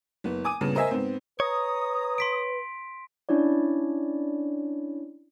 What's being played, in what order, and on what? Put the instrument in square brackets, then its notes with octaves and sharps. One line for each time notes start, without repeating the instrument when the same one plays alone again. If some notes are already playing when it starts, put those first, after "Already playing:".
[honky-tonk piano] F#1 B3
G#5 D6 D#6 D#7
G2 A#2 C#3 B3
A#4 C5 D#5 E5 G#5
G#2 B3 C4
[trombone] B4 [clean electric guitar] C#5 [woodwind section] A#5 D#6
[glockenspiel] C6 B6 D7
[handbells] C#4 D4 E4 C#5 D5